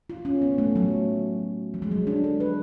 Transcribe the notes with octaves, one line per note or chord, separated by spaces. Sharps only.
F4
C#4
B3
A3
F#3
F3
G#3
F#3
D4
A4
B4